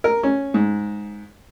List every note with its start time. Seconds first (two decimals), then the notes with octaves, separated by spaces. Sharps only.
0.04 A#4
0.23 C#4
0.54 G#2